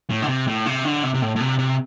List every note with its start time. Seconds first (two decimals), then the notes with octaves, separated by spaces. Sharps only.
0.10 A2
0.22 D3
0.28 C3
0.47 A2
0.66 C3
0.85 D3
1.03 C3
1.14 C3
1.22 A2
1.36 A2
1.40 C3
1.59 C3